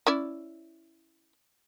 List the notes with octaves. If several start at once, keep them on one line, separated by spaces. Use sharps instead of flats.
C#4 E4 D5